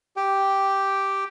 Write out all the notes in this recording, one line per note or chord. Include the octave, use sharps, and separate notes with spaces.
G4 G5